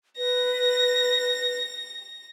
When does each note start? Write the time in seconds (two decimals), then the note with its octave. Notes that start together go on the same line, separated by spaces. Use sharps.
0.18 B4 A#6